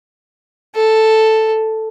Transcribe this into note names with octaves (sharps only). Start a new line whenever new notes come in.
A4